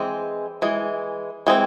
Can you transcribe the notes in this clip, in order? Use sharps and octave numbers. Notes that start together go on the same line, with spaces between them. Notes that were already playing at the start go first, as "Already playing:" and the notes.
Already playing: E3 G#3 C4
E3 G#3
E3 G#3 C4